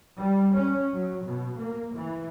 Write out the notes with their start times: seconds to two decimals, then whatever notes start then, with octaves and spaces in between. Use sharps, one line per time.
0.18 G3
0.56 C#4
0.93 F#3
1.25 B2
1.58 A#3
1.94 E3